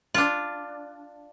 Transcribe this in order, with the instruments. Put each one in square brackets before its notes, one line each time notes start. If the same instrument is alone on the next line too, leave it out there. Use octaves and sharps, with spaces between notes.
[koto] D4 F4